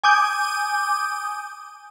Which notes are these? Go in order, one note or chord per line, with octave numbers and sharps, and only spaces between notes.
G#5 D6 D#6 G6